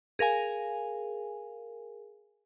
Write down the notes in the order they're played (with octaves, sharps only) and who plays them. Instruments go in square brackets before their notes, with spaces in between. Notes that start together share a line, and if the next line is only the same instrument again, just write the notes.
[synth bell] G#4 A#4 F5 G#5